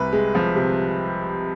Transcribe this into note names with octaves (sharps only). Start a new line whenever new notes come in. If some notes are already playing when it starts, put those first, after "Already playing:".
Already playing: C2 C3 B4
G#3
F3
C3